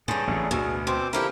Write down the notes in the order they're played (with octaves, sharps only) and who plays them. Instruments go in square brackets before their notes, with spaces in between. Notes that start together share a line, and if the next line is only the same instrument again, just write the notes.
[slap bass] G2 [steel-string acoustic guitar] D3 C#4 [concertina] G#4
[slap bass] A1 F2 A2
[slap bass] D2 [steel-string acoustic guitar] B2
[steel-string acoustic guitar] B2 [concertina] C4 C5 D6
[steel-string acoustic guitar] D3 F3 G4 [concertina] E4 A#4